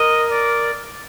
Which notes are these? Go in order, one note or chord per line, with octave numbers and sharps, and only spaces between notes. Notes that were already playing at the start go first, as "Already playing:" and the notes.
Already playing: A#4 D#5
D5